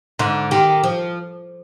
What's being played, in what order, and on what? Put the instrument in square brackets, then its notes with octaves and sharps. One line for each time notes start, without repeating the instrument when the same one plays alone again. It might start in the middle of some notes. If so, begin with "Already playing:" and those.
[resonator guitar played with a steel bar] G#2 [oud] D3
[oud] D#3 [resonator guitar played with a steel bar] G4
[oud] F3